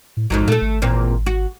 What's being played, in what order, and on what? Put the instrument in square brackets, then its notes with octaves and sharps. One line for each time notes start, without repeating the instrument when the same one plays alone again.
[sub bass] A2
[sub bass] A1 [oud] F2 G#2 F#3
[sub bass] A#2 [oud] A3 A4
[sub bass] G#1
[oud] E2 A#2 C4
F#4